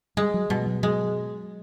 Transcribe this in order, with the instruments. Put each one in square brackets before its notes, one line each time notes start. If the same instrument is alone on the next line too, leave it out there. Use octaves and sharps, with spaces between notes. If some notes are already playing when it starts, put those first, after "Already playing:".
[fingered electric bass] G3 [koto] G#3
[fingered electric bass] F#3
[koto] B2 [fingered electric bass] G3
[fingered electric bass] G3
F#3
[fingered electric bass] F#3 [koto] G#3